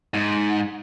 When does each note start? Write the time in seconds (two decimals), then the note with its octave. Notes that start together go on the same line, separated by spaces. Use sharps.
0.14 G#2